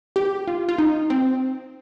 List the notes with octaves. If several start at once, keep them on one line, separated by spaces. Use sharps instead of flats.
G4
F4
F4
D#4
C4